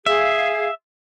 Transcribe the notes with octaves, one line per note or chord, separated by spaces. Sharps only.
G#4 E5 F5